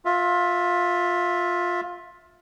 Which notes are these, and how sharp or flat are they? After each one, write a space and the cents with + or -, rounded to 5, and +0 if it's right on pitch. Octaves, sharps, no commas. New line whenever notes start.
F4 +20 E5 +0